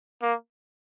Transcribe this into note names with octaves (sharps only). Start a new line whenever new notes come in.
A#3